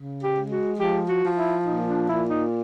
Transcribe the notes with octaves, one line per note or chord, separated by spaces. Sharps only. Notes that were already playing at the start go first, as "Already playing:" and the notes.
Already playing: C#3
G4
G#3
F#4
F3 G4
F#4
F3
E4
A#2 D#4
D4
A#2 E4
D#4